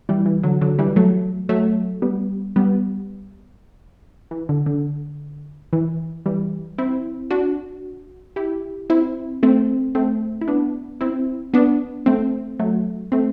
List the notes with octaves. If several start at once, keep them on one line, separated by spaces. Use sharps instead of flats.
E3 G3
E3
D3 F#3
D3 F#3
E3 G3
F#3 A3
F#3 A3
G3 B3
G3 B3
E3
D3
D3
E3
E3 G3
C4 E4
D4 F#4
E4 G4
C4 E4
A3 C4
A3 C4
E4
B3 D4
C4 E4
B3 D4
A3 C4
F#3 A3
A3 C4